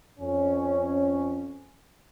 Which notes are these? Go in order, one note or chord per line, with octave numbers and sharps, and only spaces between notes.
F2 C#4